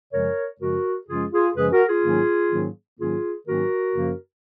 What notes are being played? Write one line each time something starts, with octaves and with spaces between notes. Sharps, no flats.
F#2 C#3 F3 G#3 C#4 A#4 C#5
F#2 C#3 F3 G#3 C#4 F#4 A#4
F#2 C#3 F3 G#3 C#4 F4 G#4
F4 G#4
F#2 C#3 F3 G#3 C#4 G#4 B4
F#4 A#4
F4 G#4
G#2 D#3 F#3 A#3 C#4
G#2 D#3 F#3 A#3 C#4
G#2 D#3 F#3 A#3 C#4 F4 G#4
G#2 D#3 F#3 A#3 C#4 F#4 A#4
F#2 C#3 F3 A#3